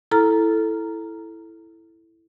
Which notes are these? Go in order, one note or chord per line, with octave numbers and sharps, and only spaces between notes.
E4 A4 A#5 F6